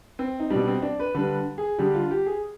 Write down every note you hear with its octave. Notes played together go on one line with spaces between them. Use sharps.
C4
D#4
B2 G3 D4
C4
D4
B4
D3 G3 B4
G#4
D3 G3 G4
F4
G4
G#4